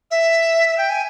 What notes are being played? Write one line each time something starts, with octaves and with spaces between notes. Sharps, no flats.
E5
G5
G#5